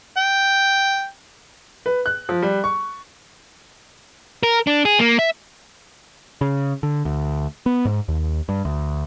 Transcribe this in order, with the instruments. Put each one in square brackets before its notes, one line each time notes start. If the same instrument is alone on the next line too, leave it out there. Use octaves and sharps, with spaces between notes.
[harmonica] G5
[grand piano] B4
F#6
F3
G3
C#6
[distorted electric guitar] A#4
D4
G#4
A#3
E5
[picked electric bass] C#3
D3
D2
B3
G#2
D#2
G2
D2